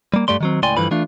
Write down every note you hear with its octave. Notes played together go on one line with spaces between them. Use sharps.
G3 A#3
G2 G3 A3 D5 C6
D#3 F#3 C4
C#2 A2 D5 G5 G#5 C6
G2 D3 E3 F3 B4 B5
E3 A3 D4 F4